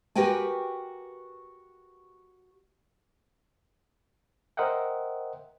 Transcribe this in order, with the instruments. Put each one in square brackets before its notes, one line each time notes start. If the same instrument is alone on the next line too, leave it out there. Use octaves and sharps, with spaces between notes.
[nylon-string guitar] F#4 G4 A#4 B4 G5 G#5
[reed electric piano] A#4 C5 D#5 E5 F#5 G5